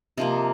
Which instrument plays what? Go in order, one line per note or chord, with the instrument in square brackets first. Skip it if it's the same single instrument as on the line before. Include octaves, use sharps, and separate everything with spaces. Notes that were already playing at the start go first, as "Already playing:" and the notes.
[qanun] C3 F3 A#3 D#5